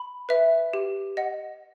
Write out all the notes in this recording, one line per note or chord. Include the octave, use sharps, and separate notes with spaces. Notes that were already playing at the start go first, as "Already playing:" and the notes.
Already playing: B5
B4 E5
G4
D#5 F#5